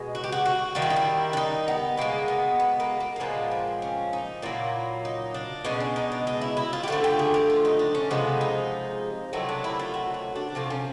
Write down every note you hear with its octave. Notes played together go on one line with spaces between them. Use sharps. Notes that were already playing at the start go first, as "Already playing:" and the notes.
Already playing: B2 G#3
F#4
G4
F#4
F#4
D#3 G3 A#3 F4
E4
D#4
E4
D4
D#4
B3
B2 G#3 A#3
B3
B3
A#3
A#3
A#3
A#2 F3 G#3 B3
C4
C#4
D#4
A#2 F#3 A#3 E4
D#4
D4
B2 G#3 C#4
D4
D#4
D4
D#4
E4
E4
F4
G4
D3 F3 A3 F#4
G4
G#4
G4
F4
D#4
D4
C#4
C3 F3 G#3 B3
D#4
C3 D#3 F#3 A3 E4
D4
E4
F4
F#4
F#4
D4
C3 F3 A3
C#4